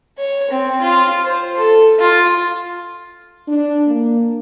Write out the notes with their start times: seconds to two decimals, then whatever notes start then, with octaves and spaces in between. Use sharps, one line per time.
0.18 C#5
0.51 C4
0.81 F4
1.25 C5
1.57 A4
1.99 F4
3.48 D4
3.87 A#3